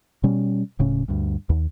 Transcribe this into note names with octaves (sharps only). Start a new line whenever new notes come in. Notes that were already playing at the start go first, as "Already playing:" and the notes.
B2 G3 C#4
D1 A2 C#3 C#4
D2 G2
D#2